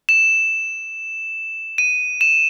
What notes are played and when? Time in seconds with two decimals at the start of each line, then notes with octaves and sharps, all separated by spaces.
0.09 E7
1.78 D#7
2.21 E7